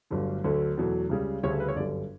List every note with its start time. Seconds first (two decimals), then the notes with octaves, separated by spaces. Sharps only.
0.11 G1 G2 D3 F#3 A3
0.44 D2 D3 F#3 A3
0.77 E2 B2 F#3 A3
1.09 C#2 C#3 G3
1.43 D2 C#3 G3 C#5
1.51 A4
1.60 B4
1.68 C#5
1.76 G1 F#2 D3 G3 D5